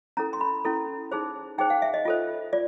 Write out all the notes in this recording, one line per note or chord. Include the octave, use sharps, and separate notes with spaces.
C#4 E4 A4 A#5
C6
B5
C#4 E4 A4
D#4 G#4 C5
D#4 G#4 C5 G5
F5
E5
D#5
F4 A4 C5
F4 D5